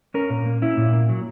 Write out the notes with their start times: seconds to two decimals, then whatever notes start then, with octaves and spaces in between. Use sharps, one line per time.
0.14 C#4 A#4
0.30 A#2
0.46 A#3
0.62 C#4 E4
0.77 A#2
0.93 A#3
1.09 F#3